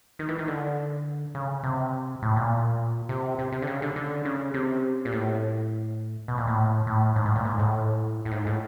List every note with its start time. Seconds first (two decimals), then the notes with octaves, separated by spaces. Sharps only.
0.19 D#3
0.29 E3
0.38 D#3
0.48 D3
1.35 C#3
1.63 C3
2.22 A2
2.36 A#2
3.09 C3
3.39 C3
3.52 C3
3.62 D3
3.67 C#3
3.82 D3
3.96 D3
4.25 C#3
4.54 C3
5.05 A#2
5.13 A2
6.28 B2
6.38 A#2
6.47 A2
6.87 A2
7.16 G#2
7.25 A2
7.36 A#2
7.45 G#2
7.59 A2
8.25 A2
8.32 G#2
8.46 A2